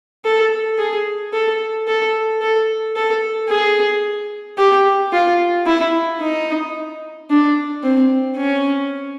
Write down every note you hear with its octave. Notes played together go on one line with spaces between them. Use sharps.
A4
G#4
A4
A4
A4
A4
G#4
G4
F4
E4
D#4
D4
C4
C#4